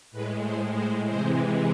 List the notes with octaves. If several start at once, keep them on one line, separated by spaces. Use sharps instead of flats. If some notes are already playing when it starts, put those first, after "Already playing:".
A2 G#3 B4
C5
C5
C3 E3 G#3 C5